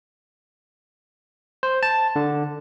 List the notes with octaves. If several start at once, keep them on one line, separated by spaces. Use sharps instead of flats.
C5
A5
D3